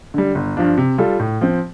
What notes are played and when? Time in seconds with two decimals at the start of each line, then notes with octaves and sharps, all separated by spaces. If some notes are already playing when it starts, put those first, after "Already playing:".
0.14 D3 G3
0.35 G1
0.57 G2 F3 D4 F4
0.78 C3
0.98 G3 F4 A4
1.19 A2
1.41 F3 C4